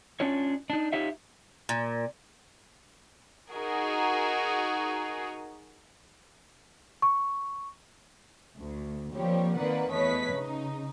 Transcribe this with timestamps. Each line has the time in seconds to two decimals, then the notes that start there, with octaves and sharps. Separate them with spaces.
0.20 C#4 D4 F4 C#5
0.70 D4 D#4
0.92 D#4 F4 G4 C#5 E5 F5
1.69 A#2
3.53 D#4 F#4 G#4 A#4 A#5
7.02 C#6
8.57 D2
9.13 F3 G3 A#3 C4 G4 C#5
9.56 D#3 A#3 C4 B4 D5 F#5
9.93 E2 A3 B4 C#5 D#5 B6
10.34 C#3 D#4